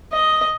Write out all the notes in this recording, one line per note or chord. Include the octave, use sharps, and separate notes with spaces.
D#5